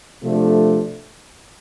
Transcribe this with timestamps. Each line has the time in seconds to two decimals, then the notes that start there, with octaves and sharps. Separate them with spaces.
0.21 C3 F3 A3 D4